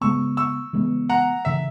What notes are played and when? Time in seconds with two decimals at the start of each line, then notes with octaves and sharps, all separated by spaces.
0.01 C#3 G#3 B3 C#6 E6
0.37 C#6 E6
0.73 C#3 E3 G#3 B3
1.09 F#5 A#5
1.45 C#3 E3 E5